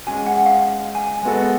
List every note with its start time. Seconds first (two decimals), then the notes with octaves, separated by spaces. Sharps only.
0.07 G#3 C#4 F#4 G#5
0.26 F#5
0.46 F5
0.95 G#5
1.23 G#3 B3 F#4 A4